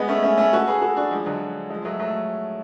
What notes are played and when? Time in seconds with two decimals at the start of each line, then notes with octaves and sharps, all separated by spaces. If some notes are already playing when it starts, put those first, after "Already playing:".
Already playing: G#3 B3
0.08 A3 C#4
0.23 A3 C#4
0.38 A3 C#4
0.53 F#4 A4
0.68 G#4 B4
0.81 F#4 A4
0.97 D4 F#4
1.11 F3 G#3
1.26 D3 F#3
1.70 F3 G#3
1.85 F#3 A3
2.00 F#3 A3